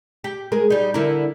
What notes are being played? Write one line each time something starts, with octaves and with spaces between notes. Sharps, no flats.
G4
G#3 G#4 A#4
G3 D#4
D3 E4 A#4